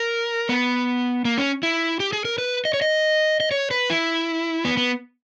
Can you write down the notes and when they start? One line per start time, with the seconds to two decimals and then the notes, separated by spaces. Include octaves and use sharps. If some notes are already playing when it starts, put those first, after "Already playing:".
Already playing: A#4
0.49 B3
1.25 A#3
1.38 C#4
1.63 E4
2.00 G4
2.13 G#4
2.25 A#4
2.38 B4
2.65 D#5
2.74 C#5
2.82 D#5
3.40 D#5
3.51 C#5
3.71 B4
3.90 E4
4.65 B3
4.77 B3